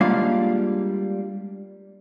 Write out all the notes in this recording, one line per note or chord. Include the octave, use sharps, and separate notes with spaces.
G3 G#3 A#3 D4 F4 F5